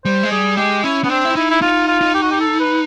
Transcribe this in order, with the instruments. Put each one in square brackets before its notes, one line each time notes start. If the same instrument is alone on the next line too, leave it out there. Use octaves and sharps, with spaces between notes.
[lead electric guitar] G3 [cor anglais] C5
[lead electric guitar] G#3
[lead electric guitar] G3 [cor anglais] G#4
[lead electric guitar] G#3 [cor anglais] G4
[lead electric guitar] C#4 [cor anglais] E4
[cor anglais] B3 [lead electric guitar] C#4
[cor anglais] C4 [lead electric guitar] D4
[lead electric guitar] E4
[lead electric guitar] D#4 [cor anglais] E4
[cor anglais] E4
[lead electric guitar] D#4 [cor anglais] F4
[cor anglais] F4
[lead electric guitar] D#4
[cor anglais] G4
F#4
G4
A4
B4